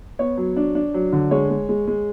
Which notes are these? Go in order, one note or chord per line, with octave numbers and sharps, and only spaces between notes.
B3 C#5
F#3
D4
D4
F#3
D3
G#3 C#5
G#3
G#3
G#3